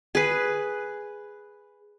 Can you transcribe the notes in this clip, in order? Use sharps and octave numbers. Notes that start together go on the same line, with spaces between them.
G#4 B4